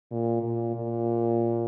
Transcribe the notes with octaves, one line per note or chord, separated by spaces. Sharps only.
A#2
A#2
A#2